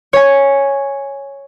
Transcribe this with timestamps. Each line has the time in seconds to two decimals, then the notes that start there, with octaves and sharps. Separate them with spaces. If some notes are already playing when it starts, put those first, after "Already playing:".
0.13 C#5 G#5